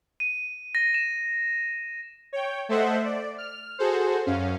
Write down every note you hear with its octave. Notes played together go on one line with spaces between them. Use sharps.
D#7
A#6
E7
C#5 G5
A3 A4 C5 D#5 E5 F#5
D5
F6
F#4 G#4 A4 C5
F#2 C#4 F5